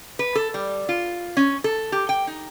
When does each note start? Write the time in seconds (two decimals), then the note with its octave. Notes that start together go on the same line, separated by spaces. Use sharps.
0.19 B4
0.35 A4
0.54 G3
0.89 F4
1.37 C#4
1.64 A4
1.92 G4
2.09 G5
2.27 D#4